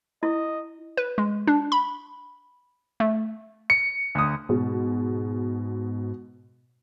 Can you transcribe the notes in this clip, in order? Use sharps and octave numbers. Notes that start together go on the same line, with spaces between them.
E4 D#5
B4
G#3
D4
B5
A3
C#7
D2 D#6
G#2 B2 G#3